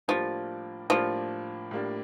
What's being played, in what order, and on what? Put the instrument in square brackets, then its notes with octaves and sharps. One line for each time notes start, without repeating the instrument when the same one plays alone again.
[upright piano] A2 G3 A#3 D4 [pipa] F3
[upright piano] A2 G3 A#3 D4 [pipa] F3
[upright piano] A2 G3 A#3 D4